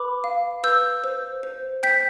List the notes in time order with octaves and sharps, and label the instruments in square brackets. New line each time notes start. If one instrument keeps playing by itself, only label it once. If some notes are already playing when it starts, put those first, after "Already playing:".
Already playing: [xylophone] B4 B5 D6
F5
B4 E6 G6
C5
C5
G5 G6 B6